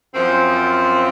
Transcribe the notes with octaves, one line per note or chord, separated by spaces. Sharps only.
F#2 F3 C4